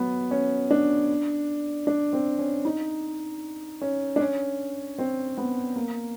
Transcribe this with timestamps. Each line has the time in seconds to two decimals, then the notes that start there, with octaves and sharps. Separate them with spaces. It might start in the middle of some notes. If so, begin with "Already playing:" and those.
Already playing: F#3 B3
0.31 C#4
0.71 D4
1.87 D4
2.13 C4
2.39 C#4
2.65 D#4
3.81 C#4
4.16 D4
4.20 C#4
4.99 C4
5.37 B3
5.76 A#3